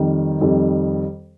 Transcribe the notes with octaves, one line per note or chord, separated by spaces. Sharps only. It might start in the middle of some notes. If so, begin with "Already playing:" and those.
Already playing: F2 D#3 G3
F2 D#3 G3